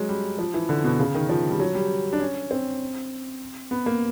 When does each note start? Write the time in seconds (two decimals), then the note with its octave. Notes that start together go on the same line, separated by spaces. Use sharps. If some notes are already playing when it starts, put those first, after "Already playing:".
Already playing: F#3 G#3
0.09 G3
0.39 F3
0.54 E3
0.69 D3
0.84 B2
1.00 C#3
1.14 D#3
1.29 F3
1.50 G3
1.60 F#3
1.75 G3
2.13 D4
2.20 C#4
2.51 C4
3.71 B3
3.86 A#3